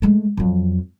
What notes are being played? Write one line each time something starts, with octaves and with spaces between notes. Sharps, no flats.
G#3 A3
F2 F#3